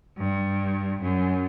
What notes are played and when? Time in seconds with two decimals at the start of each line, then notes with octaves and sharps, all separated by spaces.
0.18 G2
1.01 F#2